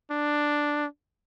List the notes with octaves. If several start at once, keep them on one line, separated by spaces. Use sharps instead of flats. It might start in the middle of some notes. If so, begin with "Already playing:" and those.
D4